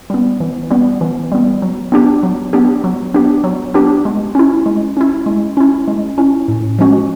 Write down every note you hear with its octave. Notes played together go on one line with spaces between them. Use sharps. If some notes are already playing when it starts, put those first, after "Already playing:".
G3 B3
E3
G3 B3
E3
G3 B3
F#3
B3 D4 G4
F#3
B3 D4 G4
F#3
B3 D4 G4
F#3
B3 D4 G4
G#3
C#4 E4
G#3
C#4 E4
G#3
C#4 E4
G#3
C#4 E4
A2
F3 G#3 C#4 F#4